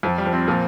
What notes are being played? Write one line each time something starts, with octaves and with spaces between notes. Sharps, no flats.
F2 F3
G3
F3
C4
A#2 F3